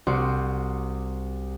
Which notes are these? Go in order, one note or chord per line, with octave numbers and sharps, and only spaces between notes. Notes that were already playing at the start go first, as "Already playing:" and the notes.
C2 C4 F#4 C6 D6